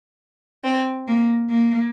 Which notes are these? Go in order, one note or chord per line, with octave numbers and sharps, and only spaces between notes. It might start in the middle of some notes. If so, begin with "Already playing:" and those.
C4
A#3
A#3